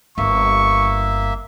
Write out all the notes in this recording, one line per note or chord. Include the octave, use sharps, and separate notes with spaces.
G1 A#3 E5 C#6